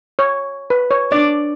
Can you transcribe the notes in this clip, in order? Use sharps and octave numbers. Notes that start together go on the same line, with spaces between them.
C#5
B4
C#5
D4 D5